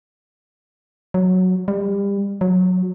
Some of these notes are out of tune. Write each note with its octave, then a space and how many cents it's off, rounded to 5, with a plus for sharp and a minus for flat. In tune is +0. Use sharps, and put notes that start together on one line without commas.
F#3 -5
G3 +30
F#3 -15